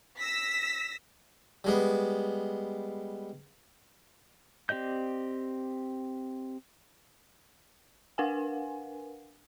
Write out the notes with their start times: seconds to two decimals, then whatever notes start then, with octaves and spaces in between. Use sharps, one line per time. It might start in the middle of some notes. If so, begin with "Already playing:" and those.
0.20 E6 A#6 B6
1.64 G3 G#3 B3
4.69 C4 G4 D5 D#5 G6
8.18 D4 A#4 B4 F5 F#5 G#5